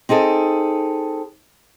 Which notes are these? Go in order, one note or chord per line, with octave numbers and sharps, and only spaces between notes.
C4 D#4 G#4 A4